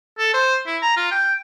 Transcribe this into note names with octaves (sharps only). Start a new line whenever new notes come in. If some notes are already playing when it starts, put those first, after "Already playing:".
A4
C5
E4
A#5
F4
G5